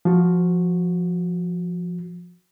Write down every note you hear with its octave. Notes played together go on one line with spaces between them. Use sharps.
F3 F#4